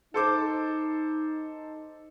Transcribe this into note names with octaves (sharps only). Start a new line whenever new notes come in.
D#4 A4 C5 D6